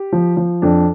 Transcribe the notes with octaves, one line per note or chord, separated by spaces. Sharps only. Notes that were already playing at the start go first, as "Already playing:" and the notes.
Already playing: G4
F3
F3
F2 D4